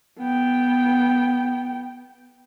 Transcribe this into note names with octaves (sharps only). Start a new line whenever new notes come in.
B3 G5